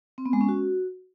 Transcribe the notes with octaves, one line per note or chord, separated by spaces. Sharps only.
C4
B3
G#3
C#4
F#4